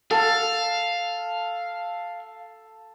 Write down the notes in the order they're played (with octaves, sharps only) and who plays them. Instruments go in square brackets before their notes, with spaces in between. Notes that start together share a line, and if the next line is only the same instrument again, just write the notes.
[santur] A4 [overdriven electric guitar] F5